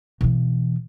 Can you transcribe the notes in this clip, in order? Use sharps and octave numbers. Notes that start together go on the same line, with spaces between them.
B2 E3